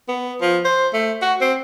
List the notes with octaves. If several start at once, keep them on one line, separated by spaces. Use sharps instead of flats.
B3
F3
C5
A3
F#4
C4